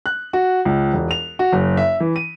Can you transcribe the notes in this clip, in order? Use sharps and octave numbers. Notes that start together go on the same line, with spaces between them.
F#6
F#4
C#2
E1
F7
F#4
F#1
E5
E3
D#7